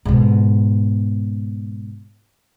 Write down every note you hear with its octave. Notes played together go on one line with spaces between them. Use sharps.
G#2 B2